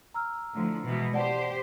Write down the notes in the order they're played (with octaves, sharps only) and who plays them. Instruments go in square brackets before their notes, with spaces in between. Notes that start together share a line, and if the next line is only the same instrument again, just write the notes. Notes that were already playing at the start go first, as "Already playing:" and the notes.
[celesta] A#5 E6 F6
[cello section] A2 D3 F3
B2 E3 G#3
[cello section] G4 C5 [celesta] D5 F#5 A5